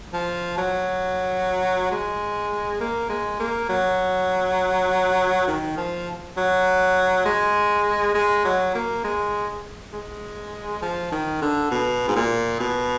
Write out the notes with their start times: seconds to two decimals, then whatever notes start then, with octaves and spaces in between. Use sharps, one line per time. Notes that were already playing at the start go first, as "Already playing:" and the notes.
0.13 F3
0.57 F#3
1.91 G#3
2.80 A#3
3.09 G#3
3.40 A#3
3.69 F#3
5.48 D#3
5.77 F3
6.37 F#3
7.26 G#3
8.15 G#3
8.45 F#3
8.75 A#3
9.04 G#3
9.93 G#3
10.82 F3
11.12 D#3
11.42 D3
11.71 B2
12.08 G#2
12.16 A#2
12.60 B2